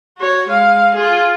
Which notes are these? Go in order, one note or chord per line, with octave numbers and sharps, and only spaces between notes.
F#4 C#5
G#3 F5
F4 G#4